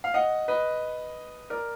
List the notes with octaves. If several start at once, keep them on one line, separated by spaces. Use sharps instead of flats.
F5
D#5 F#5
B4 D#5
A#4 D5